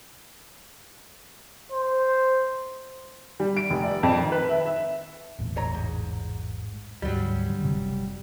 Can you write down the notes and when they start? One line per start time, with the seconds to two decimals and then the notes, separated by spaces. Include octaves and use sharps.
1.72 C5
3.40 G3
3.57 D7
3.70 F1
3.84 D5
4.03 F2
4.18 D#3
4.32 B4
4.49 E5
4.66 E5
5.39 E1 A1 A2
5.57 C#5 A#5
5.74 G#2
7.02 D2 G#2 F#3 G3
7.48 D3
7.60 F#1 C3